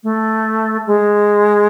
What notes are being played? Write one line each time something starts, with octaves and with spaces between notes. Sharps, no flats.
A3
G#3